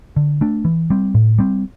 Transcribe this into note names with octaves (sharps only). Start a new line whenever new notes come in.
D3
A3 D4
E3
G3 C4
A2
G3 C4